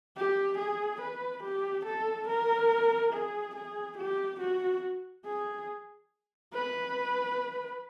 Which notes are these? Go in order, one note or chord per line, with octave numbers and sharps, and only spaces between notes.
G4
G#4
B4
G4
A4
A#4
G#4
G#4
G4
F#4
G#4
B4